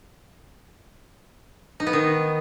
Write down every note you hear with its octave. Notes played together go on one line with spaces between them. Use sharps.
D#4
B3
D#3